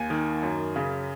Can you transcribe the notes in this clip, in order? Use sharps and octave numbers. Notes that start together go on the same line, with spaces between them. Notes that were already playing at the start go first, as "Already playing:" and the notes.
Already playing: D#2 G#5
D#3
F#2
C#3